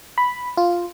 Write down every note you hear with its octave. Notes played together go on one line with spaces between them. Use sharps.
B5
F4